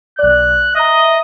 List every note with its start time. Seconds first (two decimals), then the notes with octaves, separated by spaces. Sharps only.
0.19 B1 D5 F#6
0.75 D#5 E5 A#5